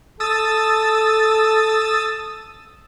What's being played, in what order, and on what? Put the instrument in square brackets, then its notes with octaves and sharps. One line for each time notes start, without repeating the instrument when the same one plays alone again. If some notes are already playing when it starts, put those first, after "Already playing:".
[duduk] A4 [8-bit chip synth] D#6 E6 A6